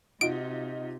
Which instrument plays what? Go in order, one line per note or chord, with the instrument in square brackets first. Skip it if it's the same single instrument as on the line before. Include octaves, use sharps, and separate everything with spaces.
[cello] C3 [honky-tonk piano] D#4 F4 F#4 [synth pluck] D7